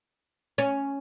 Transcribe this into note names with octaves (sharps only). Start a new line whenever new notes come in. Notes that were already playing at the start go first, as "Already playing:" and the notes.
C#4